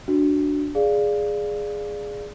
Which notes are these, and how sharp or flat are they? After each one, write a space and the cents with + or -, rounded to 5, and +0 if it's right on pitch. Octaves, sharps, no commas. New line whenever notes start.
D4 +0 F#4 +0
G#4 +0 D5 +0 F5 -5